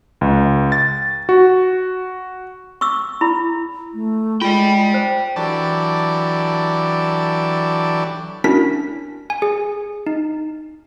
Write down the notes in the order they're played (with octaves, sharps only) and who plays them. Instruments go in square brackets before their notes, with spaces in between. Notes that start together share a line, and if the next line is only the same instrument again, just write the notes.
[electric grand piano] C#2
A6
F#4
[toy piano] C#6 D6 E6
E4 B5
[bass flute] A3
[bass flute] G#3 [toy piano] F4 [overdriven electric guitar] D5 G5
[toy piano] C5
[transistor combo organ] E3 F#3 D4 G4 A4 D5
[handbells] C#4 D4 E4 F#4 A#4 B6
G#5
G#4
D#4